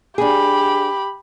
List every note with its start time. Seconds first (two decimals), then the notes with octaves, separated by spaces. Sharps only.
0.18 D4 G4 G#4 B5